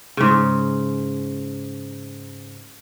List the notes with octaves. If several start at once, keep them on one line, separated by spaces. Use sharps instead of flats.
G#2 C#3